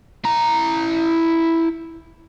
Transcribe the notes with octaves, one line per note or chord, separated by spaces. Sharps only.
E4 A#5